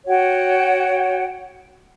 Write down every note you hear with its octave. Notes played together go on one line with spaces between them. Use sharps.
F#4 C#5 F#5 G5